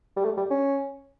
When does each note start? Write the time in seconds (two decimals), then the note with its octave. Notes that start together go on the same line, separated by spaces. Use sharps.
0.16 G3
0.25 A3
0.37 G3
0.51 C#4